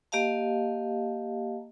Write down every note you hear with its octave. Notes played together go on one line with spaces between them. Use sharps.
A#3 G4 D#5 F5 A5